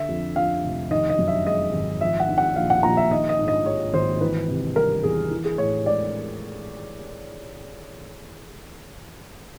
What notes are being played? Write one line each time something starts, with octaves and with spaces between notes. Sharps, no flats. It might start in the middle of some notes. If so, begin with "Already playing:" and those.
Already playing: D3 E5
F2
F3 F5
F1
D#3 D#5
D#5
F#2
E5
G#3 D#5
G#1
F3 E5
F#5
G#2
F#5
A#1 F5
F#5
A#1 A#5
E5
D#3 D#5
D#5
G#2
D#5
G#3 C#5
G#1 C5
E3 B4
C3
G3 A#4
E2 G#4
E3
G#4
A2 C#5
G#3 D5